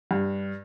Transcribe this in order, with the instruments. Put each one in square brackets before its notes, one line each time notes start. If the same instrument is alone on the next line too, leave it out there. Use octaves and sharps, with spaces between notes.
[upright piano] G2